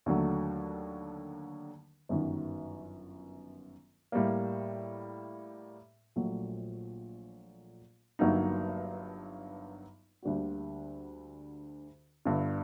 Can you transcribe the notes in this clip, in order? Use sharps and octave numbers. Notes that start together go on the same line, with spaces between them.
D#2 D3 F#3 A3
G1 F#2 D#3 F#3
A2 G3 A#3
A#1 A#2 F#3 A3
G1 G2 F#3 A#3 D#4
D2 D3 G3 A#3 F#4
G1 G2 D3